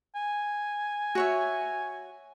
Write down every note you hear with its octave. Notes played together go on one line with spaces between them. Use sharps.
G#5
F#4 C#5 E5